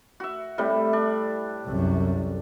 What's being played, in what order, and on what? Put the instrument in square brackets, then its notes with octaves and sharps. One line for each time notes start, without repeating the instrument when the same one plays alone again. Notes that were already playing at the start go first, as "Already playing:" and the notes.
[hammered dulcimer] F#4 E5
A2 C3 G3
D4
[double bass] C2 F#2